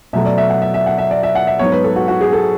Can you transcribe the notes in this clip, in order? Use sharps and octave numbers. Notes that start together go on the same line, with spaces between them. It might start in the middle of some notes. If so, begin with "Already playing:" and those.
B2 F#3 A3 E5
D5
E5
F#5
E5
E5
F#5
E5
D5
E5
F#5
E5
G#2 F#3 B3 C#5
B4
A4
F#4
F#4
G#4
A4